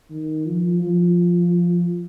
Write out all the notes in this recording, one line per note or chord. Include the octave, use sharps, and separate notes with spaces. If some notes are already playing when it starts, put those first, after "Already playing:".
D#3
F3
F3